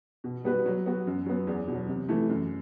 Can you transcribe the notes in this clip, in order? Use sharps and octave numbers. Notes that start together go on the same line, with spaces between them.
B2
G3 B3 F#4 B4
F#3
B3 F#4
F#2
F#3 B3
E2
B2 F#3
C3
E3 A3
F#2